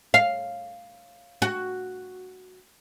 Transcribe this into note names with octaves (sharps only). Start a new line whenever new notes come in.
F5
F#4